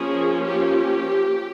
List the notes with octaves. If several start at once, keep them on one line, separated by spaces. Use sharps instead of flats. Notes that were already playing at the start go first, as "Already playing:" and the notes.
Already playing: F3 A#3 C#4 G#4
G4